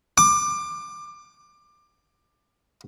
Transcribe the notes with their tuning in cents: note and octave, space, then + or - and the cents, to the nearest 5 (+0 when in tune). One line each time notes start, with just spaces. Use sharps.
D6 +20